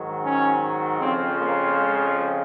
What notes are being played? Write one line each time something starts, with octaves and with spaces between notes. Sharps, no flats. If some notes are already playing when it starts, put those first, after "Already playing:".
Already playing: G#2 D#3 F#3
C#4
F2 C#3 F3 C4
A#3
G#3